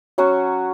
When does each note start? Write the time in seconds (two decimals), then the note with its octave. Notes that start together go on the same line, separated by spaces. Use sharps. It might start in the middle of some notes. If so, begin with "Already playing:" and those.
0.18 F#3 C#4 F#4 C#5